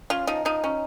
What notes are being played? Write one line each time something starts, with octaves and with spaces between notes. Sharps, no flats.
C#4 F4
F3 D#4
F3 D#4
C#4